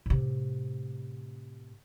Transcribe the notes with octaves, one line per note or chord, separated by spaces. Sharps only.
A2 C3